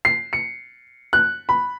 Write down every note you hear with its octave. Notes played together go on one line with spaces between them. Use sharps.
C7
C#7
F#6
B5